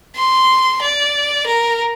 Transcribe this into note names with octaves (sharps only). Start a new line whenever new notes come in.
C6
D5
A#4